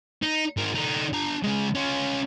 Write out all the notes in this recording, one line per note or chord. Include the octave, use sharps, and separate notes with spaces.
D#4
G#2 A#4
D3 D#4
D4 A#5
C#3 G#3
C#4 F4